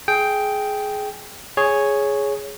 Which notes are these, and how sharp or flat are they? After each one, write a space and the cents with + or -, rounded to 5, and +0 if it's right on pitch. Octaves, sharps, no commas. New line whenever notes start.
G#4 +15 G5 +0
G#4 +0 C#5 +0